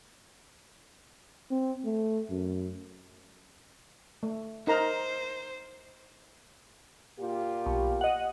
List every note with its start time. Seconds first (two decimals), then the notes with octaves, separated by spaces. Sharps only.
1.51 C4
1.85 A3
2.30 F#2
4.23 A3
4.67 D#4 A#4 C5 A#5
7.20 A#2 F4 G4
7.66 B1
8.01 D#5 F#5